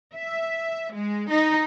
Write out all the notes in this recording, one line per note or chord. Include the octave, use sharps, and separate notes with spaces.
E5
G#3
D#4